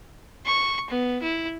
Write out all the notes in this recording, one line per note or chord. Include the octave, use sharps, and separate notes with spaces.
C#6
B3
E4